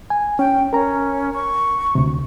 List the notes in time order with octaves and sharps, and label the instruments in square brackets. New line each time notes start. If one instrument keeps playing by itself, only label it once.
[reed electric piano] G#5
[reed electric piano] C#4 [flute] G5
[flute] C#4 [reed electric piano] A#4 A#5
[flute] C#6
[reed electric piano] D2 C3